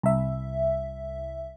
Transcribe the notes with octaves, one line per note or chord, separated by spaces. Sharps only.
C2 E5